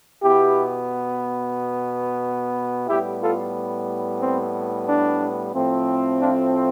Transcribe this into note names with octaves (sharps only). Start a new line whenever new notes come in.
B2 B3 E4 G4
A2 G3 B3 E4 G4
F4 A4
C4
D4
A2 F3 A3 C4
D4 F4